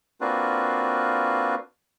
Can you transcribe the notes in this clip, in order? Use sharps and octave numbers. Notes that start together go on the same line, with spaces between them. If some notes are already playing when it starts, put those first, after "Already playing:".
A#3 C4 D4 F4 F#4 B4